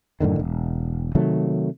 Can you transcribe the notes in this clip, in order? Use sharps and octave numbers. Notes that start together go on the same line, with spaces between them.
F#2 A2 D3 D#3
E1
C3 D#3 F#3 A3